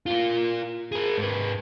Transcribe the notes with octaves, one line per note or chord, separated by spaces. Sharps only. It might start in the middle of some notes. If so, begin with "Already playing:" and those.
A#3 F4
G#4 A#4
G#2 B4